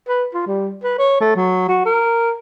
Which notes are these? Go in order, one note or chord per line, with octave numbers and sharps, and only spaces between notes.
B4
F4
G3
B4
C#5
A3
F#3
F#4
A#4